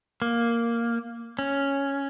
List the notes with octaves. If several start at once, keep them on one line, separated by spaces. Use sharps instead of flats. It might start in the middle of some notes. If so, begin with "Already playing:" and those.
A#3
C#4